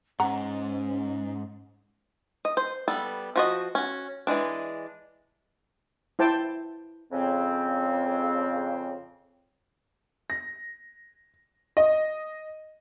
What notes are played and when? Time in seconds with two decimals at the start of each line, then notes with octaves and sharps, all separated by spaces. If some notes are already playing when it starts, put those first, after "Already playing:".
0.20 G#2 C#4 F#5 A#5
2.45 D#5
2.57 C5
2.88 G3 B3 A4
3.36 F3 F#4 D#5
3.75 C#4 F#4
4.27 E3 F#3 G#3 D4
6.19 E4 C5 G5 A5
7.11 F2 C#3 C4
10.30 A#6
11.77 D#5